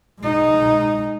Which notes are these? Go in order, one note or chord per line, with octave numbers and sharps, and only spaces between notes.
G#3 D#4